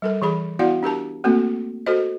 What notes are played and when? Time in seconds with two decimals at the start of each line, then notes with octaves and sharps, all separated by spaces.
0.02 G3 A4 A#4
0.22 E3 G#4 B5
0.59 B3 E4 F#4 D5 F5 F#5
0.83 D4 G4 A#4 A5
1.24 A3 A#3 C4 F#4 A4
1.86 F#4 A4 A#4 C5 D#5